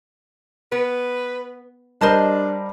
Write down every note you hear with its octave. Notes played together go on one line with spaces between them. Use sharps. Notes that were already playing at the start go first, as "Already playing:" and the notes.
B3 B4
G3 D4 A#4 C5 D#5 A5